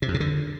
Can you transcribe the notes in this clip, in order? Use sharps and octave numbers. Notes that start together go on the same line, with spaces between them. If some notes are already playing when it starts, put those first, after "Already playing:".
C3
F2
C3
D3